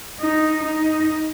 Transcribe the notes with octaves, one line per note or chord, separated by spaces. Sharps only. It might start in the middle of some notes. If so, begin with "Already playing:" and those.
D#4
D#4